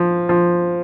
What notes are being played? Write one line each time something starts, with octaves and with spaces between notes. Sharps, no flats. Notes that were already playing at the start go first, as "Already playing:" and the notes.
Already playing: F3
F3